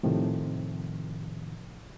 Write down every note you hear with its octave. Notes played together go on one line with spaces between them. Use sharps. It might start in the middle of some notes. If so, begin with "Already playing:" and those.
A2 C3 D#3 F3